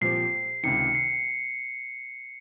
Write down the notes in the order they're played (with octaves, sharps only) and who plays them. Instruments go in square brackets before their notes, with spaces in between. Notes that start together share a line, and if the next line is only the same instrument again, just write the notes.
[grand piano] A#2 F3 C4 G4 [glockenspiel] C7
[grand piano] C#2 C3 D#3 [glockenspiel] C#7
[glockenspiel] C7